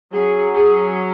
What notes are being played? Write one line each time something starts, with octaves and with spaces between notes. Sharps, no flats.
F#3 C#4 G#4
G#4